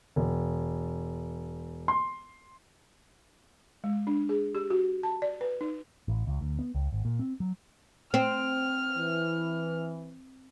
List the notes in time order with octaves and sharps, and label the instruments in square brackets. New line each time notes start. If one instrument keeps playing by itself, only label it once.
[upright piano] E1
C6
[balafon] G#3
D4
G#4
G4
F#4
A5
D5
B4
D#4
[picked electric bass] A1
C#2
D2
B3
C#2
G#1
A#2
C4
F#3
[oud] C4 [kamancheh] F6
[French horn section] E3